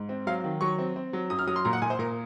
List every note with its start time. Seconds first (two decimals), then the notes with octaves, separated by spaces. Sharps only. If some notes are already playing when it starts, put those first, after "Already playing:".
Already playing: G#2
0.09 C4
0.27 F#3 F5
0.44 D#3
0.61 F#3 C#6
0.78 C4
0.96 C4
1.13 F#3
1.30 F#2 D#6
1.39 F6
1.47 F#3 D#6
1.56 C6
1.65 A#2 A#5
1.73 F#5
1.82 A#2 G#5
1.90 C5
1.99 A#2 A#4